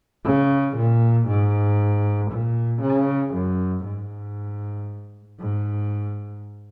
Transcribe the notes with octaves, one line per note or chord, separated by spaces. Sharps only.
C#3
A#2
G#2
A#2
C#3
F#2
G#2
G#2